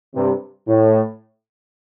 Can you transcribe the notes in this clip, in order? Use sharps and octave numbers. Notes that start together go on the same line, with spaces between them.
G2 C3
A2